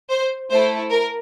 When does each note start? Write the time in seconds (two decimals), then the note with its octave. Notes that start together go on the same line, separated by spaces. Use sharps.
0.10 C5
0.50 A3 E4 A4 C5
0.91 A#4